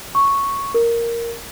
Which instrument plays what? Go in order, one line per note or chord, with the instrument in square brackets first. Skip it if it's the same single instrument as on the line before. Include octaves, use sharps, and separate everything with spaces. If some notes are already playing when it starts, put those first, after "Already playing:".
[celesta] C#6
A#4